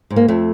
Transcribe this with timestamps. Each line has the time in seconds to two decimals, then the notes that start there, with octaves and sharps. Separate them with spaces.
0.11 G#2
0.16 A#3
0.28 F2 A3